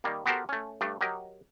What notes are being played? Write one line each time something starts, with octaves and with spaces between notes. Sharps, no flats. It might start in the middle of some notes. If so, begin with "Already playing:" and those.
D#3 G3 A#3
B3 F#4 G4 A4 A#4 C5
A3 C#4
G2 A3 D4
F#3 G4 A#4 D#5